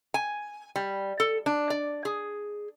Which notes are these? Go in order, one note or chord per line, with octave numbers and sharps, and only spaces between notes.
G#5
G3
A4
D4
D5
G#4